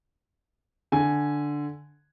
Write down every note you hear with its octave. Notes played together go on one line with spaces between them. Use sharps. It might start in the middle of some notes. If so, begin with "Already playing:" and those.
D3 G#5